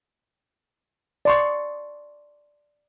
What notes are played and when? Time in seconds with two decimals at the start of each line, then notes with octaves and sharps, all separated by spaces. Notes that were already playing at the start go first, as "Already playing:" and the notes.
1.25 D5 C6 C#6